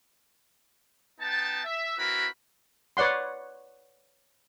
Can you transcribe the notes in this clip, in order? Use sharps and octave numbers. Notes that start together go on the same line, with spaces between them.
B3 D#4 G5 A5
E5
C4 E4 F#4 A#4 B4 B5
B4 C#5 D5 F#5 C6